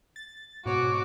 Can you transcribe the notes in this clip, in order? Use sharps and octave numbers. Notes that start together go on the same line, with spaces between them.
A6
G#2 B2 F#4 C#5 D6